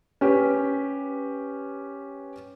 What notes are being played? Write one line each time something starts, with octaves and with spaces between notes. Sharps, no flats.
C#4 G4 B4